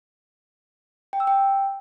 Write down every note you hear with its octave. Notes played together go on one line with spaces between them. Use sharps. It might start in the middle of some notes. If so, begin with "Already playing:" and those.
G5
E6
G5